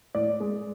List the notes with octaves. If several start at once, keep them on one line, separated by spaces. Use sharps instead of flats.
A2 D5
G#3